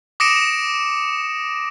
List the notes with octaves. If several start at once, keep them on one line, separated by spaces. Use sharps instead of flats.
D6 D#6 A#6 C#7 D7 E7